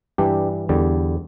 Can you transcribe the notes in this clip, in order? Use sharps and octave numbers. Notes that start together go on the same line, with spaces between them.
G2 E3 G3 D4 G4
E2 D3 G3